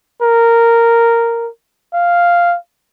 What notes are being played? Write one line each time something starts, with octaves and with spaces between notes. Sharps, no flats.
A#4
F5